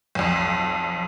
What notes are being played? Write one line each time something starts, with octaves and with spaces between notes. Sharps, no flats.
B1 F2